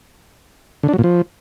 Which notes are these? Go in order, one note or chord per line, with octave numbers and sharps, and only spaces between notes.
D3
D4
F#3
A#2
F3